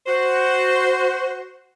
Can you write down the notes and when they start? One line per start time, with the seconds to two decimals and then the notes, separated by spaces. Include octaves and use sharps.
0.07 F#4 C5